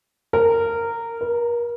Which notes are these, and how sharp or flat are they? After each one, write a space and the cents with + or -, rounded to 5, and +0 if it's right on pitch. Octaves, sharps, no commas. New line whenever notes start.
A#4 -15
A#4 +35